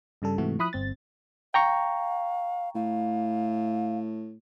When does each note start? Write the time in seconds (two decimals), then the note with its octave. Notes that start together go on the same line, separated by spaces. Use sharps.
0.22 G2 C#3 G3 A4
0.38 G#2 C3 E3 A3 F#4
0.59 F3 E4 B5 D#6 F#6
0.73 G1 C4 A6
1.54 F5 G5 A#5 C#6
2.75 A2 F5